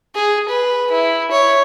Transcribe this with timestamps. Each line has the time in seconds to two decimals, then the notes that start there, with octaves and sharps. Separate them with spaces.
0.15 G#4
0.48 B4
0.91 E4
1.31 C#5